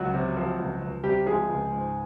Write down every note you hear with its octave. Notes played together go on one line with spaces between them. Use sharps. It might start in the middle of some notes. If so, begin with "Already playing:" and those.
Already playing: C#2 F#3 F#4
C3
F3
C#2
C#2
C3 G3 G4
F3 G#3 G#4
C#2
G#2